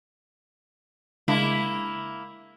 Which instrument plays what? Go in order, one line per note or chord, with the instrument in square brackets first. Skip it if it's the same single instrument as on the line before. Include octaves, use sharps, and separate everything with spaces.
[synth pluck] C#3 G#3 D4 [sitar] A#3 E4